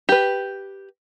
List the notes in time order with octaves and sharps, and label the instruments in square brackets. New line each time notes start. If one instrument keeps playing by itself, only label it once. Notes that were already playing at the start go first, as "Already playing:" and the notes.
[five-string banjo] G4 B4